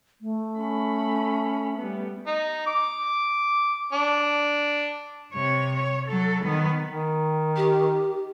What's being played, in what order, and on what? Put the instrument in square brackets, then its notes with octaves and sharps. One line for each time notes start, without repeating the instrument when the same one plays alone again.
[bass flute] A3
[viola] C#4 B5
G3 B3
[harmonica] D#4
D6
D4
[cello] C3 C#5
C#5
F#3 A4
D#3 B3
[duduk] D#3
[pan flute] G4